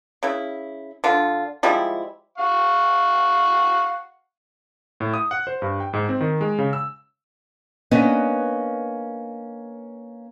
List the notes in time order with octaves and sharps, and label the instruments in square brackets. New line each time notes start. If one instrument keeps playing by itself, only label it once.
[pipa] C#3 E4
D3 F4
F3 G3 G#3 E4
[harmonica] F5 F#5 C#6
[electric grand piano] A2
D#6
F#5
C5
G2
G5
G#2
C4
D#3
G#3
C#3
E6
[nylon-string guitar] A#3 B3 C#4 D4 B4 D#5